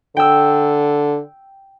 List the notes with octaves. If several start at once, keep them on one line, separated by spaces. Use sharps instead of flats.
D3 G5 E6